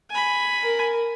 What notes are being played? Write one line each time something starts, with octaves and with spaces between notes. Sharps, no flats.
G#5 B5
A#4